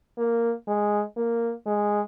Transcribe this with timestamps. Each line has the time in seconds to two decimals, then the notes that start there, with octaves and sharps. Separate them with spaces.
0.18 A#3
0.68 G#3
1.17 A#3
1.67 G#3